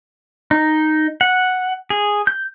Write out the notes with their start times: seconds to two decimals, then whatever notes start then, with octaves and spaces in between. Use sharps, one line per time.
0.51 D#4
1.21 F#5
1.90 G#4
2.27 G6